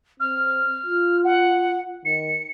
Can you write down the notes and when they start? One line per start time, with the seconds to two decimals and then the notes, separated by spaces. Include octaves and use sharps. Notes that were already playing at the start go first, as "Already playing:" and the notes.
0.20 C4 F6
0.86 F4
1.24 F#5
2.05 D#3 C#7